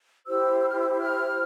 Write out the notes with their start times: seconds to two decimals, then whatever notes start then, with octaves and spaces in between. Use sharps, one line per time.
0.26 E4 G4 C5 E6
0.60 E6
0.68 F6
0.79 E6
0.90 E6
1.00 F6